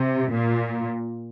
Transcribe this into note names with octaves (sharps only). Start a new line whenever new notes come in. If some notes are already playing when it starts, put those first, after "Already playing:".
Already playing: C3
A#2